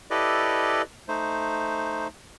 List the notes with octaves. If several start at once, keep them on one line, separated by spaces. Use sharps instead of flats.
E4 G4 A4 B4 D5 D#5
A3 D#4 C5